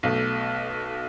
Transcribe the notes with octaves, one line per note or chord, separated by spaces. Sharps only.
B1 B2 A3